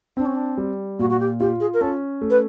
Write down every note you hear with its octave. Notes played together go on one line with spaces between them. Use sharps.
C4 D4
C#4
D4
G3
A#2 F#4
F#4
G4
F4 G4
G#4
A#4
C#4 A4
A3
B4